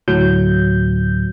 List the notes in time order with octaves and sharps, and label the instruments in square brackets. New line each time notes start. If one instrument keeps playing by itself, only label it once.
[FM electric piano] D2 A2 F#3 G6